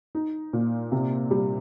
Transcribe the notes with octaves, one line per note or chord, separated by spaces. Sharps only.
D#4
A#2
C3
G3